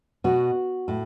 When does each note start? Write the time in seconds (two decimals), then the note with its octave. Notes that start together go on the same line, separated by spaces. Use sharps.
0.24 B2 F#4
0.88 A2